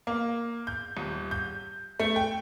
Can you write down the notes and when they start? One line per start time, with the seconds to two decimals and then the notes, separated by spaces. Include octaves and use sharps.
0.07 A#3
0.67 G6
0.97 D#1
1.31 G6
2.00 A3
2.16 G5